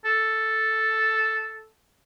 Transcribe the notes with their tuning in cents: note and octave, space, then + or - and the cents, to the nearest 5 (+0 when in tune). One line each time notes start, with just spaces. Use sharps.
A4 +0